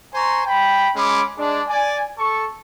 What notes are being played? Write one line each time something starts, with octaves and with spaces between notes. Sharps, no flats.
C5 G#5 A#5 C#6
G5 B5
G#3 C#4 B5 D6
G#3 D4
D5 G#5
A4 C#6